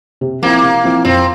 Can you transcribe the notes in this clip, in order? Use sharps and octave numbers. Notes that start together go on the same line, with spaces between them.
C3
F3 A#3 C4 E4
C3
F3 C4 E4
F2 C4